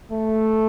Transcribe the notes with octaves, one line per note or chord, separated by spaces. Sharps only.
A3